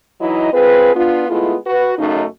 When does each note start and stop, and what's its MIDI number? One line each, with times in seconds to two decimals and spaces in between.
0.20 0.51 52
0.20 0.51 54
0.20 0.51 63
0.20 0.51 64
0.20 0.51 75
0.53 0.93 60
0.53 0.93 65
0.53 0.93 68
0.53 0.93 71
0.95 1.28 59
0.95 1.28 62
0.95 1.28 65
1.29 1.55 56
1.29 1.55 57
1.29 1.55 59
1.29 1.55 64
1.29 1.55 65
1.66 1.96 66
1.66 1.96 71
1.98 2.24 42
1.98 2.24 49
1.98 2.24 57
1.98 2.24 63